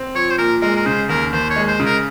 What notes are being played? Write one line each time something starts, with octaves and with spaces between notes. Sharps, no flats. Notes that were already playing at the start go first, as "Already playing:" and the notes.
Already playing: C4
F3 C#5
C5
A#2 A#4
G#3 A#4
A#4
C#3 C5
D#2 A#4
D#2 C5
C#5
G#3
C5
C#3
A#4